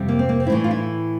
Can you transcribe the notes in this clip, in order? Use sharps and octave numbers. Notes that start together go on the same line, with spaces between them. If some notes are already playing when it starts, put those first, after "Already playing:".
Already playing: F2 C3 G3
A#3
C4
A#3
C4
E4
A2 E3 A3 D4
F4
E4